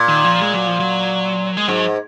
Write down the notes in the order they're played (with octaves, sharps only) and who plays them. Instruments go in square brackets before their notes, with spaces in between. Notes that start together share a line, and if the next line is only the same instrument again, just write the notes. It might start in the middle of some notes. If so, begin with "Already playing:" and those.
Already playing: [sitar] A#2
[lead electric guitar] D#3
F3
G#3
F#3
F3
F#3
G#3
[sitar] G#2 [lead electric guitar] F#3